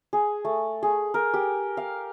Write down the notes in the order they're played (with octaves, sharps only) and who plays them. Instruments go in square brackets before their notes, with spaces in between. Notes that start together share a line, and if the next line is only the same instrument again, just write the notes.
[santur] G#4
A3
G#4
A#4
G4
F5